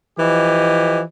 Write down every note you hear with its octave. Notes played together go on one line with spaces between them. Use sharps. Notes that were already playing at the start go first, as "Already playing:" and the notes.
E3 F3 E4 G4 D#5